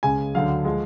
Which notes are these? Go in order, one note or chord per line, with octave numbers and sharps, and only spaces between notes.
C#2 C#3 G#3 G#5
D2 D3 F#3 F5
F3 G#3